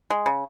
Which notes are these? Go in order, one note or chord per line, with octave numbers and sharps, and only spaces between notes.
G#3
C#3